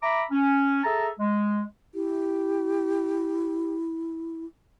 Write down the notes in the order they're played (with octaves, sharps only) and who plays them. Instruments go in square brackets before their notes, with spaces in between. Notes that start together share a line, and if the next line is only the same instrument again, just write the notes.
[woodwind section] E5 A#5 B5 D6
C#4
G#4 A4 E5 A5 A#5
G#3
[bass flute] E4 [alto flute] G4